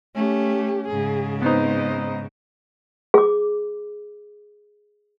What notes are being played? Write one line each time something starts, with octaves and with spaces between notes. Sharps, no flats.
A3 C#4 G4
G#2 C#3 G#4
B3 C4 D#4 C5 D#5
G#4 D6